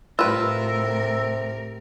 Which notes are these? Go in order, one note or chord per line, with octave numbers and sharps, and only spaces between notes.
A2 C3 F4 A#4 B4 E6